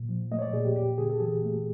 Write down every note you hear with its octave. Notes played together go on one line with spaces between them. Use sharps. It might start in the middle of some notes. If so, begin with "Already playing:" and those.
Already playing: A#2
F3
A3 D#5
C#5
D5
A#2 G#4
G4
E2 G4
C#3 G#4
A4
E3 G#4
A3